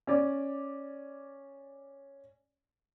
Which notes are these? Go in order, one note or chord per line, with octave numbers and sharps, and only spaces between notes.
C#4 D5